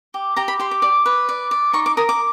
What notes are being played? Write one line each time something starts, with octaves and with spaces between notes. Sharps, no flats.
G4
G4 A#5
B5
G4 C6
D6
D5
B4
D5
D5
D#4 C#6
D6
A#4 D#6
D6